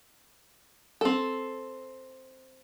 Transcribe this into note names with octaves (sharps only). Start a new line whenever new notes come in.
C4 A4